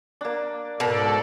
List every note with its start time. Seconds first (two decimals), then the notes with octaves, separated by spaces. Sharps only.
0.21 A#3 D4
0.80 G#2 B2 A4 A#4 D5